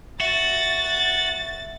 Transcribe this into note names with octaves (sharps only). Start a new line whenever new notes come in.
F#4 E5 A6